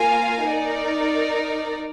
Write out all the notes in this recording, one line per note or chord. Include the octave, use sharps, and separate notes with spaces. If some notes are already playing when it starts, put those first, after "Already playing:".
Already playing: A#3 F4 A#4 F5 G#5
D#4 A#4 D5